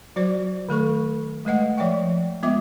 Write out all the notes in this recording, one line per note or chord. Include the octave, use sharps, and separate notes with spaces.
F#3 F#4 C5 D5
D#3 A3 A4 C#6
G#3 A3 B4 D#5 F#5
F3 D5 E5 G5 C#6
G#3 B3 F4 E5 D6